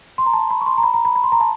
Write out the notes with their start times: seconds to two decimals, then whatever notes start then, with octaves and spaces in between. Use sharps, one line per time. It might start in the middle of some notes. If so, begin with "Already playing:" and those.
0.18 C6
0.26 A#5
0.33 A5
0.50 B5
0.61 C#6
0.66 C6
0.78 A#5
0.83 B5
0.94 A#5
1.05 B5
1.16 B5
1.24 C6
1.32 A#5
1.41 A5